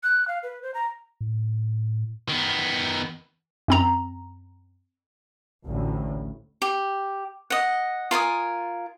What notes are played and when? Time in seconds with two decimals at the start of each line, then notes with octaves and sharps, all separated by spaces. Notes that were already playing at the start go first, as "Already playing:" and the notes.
0.03 F#6
0.28 F5
0.43 B4
0.63 C5
0.74 A#5
1.21 A2
2.29 D#3 B3
3.68 F#2 C4 A#5
5.66 A1 D2 A2
6.62 G4
7.50 D#5 F#5
8.11 F4 A#4 G#5 D#6